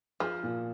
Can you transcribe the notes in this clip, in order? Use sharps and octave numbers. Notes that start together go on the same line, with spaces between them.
F3 G#4
A#2